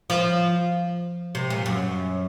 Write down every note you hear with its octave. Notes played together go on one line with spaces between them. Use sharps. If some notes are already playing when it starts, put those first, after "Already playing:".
F3
C3
A#2
F#2